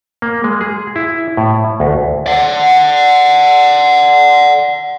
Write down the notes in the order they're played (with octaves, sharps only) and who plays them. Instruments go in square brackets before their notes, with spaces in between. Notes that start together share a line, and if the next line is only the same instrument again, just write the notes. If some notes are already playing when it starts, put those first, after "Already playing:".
[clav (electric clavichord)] A#3
G#3
G#4
E4
A2
D2
[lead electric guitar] D5 F#5